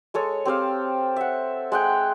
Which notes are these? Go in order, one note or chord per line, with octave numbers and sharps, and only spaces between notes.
G#3 A4 C#5
C4 G4 C5 F5
E5 F#5
G#3 F#5 G5